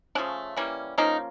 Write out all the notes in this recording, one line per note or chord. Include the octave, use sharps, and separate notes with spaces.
C#3 F3 A3 C#4 D4
E3 G3 A#3 C#4
F3 A#3 C#4 D#4